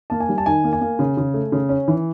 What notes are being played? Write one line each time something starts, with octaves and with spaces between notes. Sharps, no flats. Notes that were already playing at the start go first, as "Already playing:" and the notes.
A#3 A5
G#5
G3
A5
D#3 G#5
A#3
G#5
A#3
C#3
C#3
A3
C#3
C#4
E3